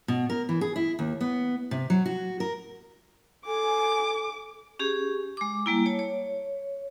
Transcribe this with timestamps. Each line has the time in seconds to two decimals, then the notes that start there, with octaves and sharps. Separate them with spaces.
0.08 B2
0.30 A#4
0.49 E3
0.61 G#4
0.76 E4
0.99 D#2
1.21 B3
1.71 C3
1.90 F#3
2.06 F#4
2.40 A#4
3.46 A4 G#5 D6
4.79 C#4 G4 G#4
5.37 G#3 D6
5.66 G3 A#3 E4
5.86 C#5 A5
5.99 C#5